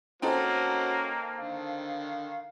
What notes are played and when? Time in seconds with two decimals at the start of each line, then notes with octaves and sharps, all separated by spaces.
0.22 A#3 C4 C#4 D#4 F#4 A4 C5
1.37 D3 D#3 F5